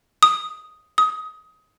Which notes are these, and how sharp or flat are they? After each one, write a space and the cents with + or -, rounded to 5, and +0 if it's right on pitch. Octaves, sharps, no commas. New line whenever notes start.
D#6 +5
D#6 +20